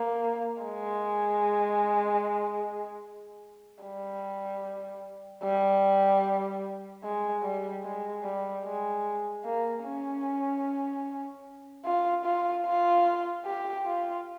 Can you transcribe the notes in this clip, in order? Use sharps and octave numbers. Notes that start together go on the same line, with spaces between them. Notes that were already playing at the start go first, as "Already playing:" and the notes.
Already playing: A#3
G#3
G3
G3
G#3
G3
G#3
G3
G#3
A#3
C#4
F4
F4
F4
G4
F4